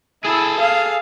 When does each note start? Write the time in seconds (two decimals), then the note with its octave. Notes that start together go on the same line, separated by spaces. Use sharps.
0.24 E4 G#4 A4
0.61 F5